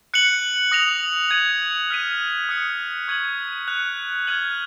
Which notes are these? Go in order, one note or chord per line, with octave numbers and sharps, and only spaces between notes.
F#6 C#7 F#7
D#6 A#6 F7
G#6 D#7 F#7
F6 B6 D#7
D#6 F#6 C#7 F#7
C#6 G#6 D#7 F#7
F#6 C#7 F7
F6 G#6 D#7 F#7